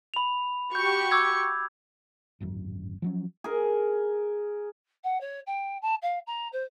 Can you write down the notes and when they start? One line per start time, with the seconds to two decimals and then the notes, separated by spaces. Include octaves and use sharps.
0.14 B5 F7
0.75 F#4 G4 C#6 G6
1.11 D6 E6 G#6
2.40 D1 G#1 F#2
3.02 F3 F#3 C#4
3.44 G#4 A#4
5.04 F#5
5.20 C#5
5.46 G5
5.82 A5
6.02 F5
6.26 A#5
6.52 C5